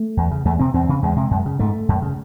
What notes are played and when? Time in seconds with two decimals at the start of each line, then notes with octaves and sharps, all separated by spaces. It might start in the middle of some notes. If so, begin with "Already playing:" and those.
Already playing: A3
0.17 E2
0.31 C#3
0.45 E2 A3
0.59 C3 C4
0.74 E2 C4
0.89 C#3
1.02 E2 G#3
1.16 C3
1.31 F#2
1.46 C#3
1.59 G#2 A3
1.89 F#2
2.02 C#3